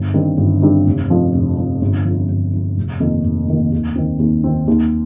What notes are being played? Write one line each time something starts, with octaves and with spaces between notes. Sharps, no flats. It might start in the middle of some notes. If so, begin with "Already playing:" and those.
Already playing: G1
G2 D#3 C4
G1
G2 D#3 C4
F1
F2 F3
F1
F2 F3
G1
F2 F3
G1
F2 F3
F1
F2 D#3 A#3
F1
F2 D#3 A#3
D#2
D#3 C4
D#2
D#3 C4
D#2